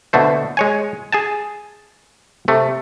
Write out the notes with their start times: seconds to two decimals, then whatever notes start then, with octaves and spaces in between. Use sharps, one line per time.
0.13 B2 D3 A3 C5
0.57 G#3 C#5 G#5
1.12 G#4 G#5 A5
2.48 C3 A3